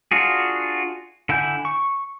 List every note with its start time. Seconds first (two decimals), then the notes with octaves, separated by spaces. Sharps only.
0.11 D4 F4 F#4 G#4
1.29 D3 E4 F#5 G#5 G6
1.65 C#6